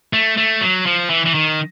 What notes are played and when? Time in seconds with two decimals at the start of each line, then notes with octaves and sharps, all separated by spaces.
0.13 A3
0.37 A3
0.61 F#3
0.86 F3
1.10 E3
1.26 E3
1.35 D#3